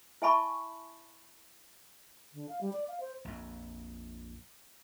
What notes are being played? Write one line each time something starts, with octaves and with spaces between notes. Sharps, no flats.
E4 E5 G#5 A5 B5 C#6
D3
F5
G3
D5
F5
C5
A#1 F2